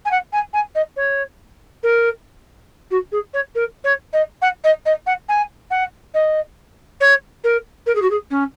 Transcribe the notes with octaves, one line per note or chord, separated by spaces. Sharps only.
G#5
F#5
G#5
G#5
D#5
C#5
A#4
F#4
G#4
C#5
A#4
C#5
D#5
F#5
D#5
D#5
F#5
G#5
F#5
D#5
C#5
A#4
A#4
G#4
F#4
G#4
C#4